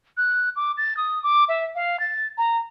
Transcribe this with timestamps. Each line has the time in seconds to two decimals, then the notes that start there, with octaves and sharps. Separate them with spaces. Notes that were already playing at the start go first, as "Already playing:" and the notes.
0.17 F#6
0.56 D6
0.78 A6
0.97 D#6
1.23 D6
1.49 E5
1.76 F5
2.00 A6
2.38 A#5